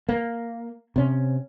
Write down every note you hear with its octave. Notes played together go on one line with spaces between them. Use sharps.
A#3
C3 C#4